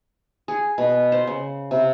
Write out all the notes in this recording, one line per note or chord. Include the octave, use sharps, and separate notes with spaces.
G#4
B2
C5
C#3
C3